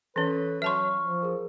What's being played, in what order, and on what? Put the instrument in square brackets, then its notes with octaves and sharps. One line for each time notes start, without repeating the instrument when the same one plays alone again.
[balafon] E3 C#4 [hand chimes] A4 C#5 [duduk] B4
[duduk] F#3 [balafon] E5 A5 C6 [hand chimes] C#6 F6
[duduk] F3
[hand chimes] G#4 A#4